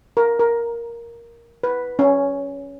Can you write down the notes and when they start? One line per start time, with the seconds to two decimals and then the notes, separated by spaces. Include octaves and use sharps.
0.17 A#4
0.39 A#4
1.63 B4
1.99 C#4